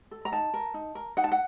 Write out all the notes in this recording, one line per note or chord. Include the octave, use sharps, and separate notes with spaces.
A4
A#5
D#4 A5
A#4
D#4
A#4
D#4 F#5
A5
F#5